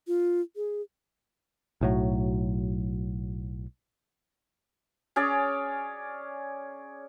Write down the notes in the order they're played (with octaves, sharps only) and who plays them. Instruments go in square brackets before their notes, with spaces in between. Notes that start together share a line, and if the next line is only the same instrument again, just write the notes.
[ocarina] F4
G#4
[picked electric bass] B1 A2 F#3
[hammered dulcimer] C#4 G#4 C#5 D5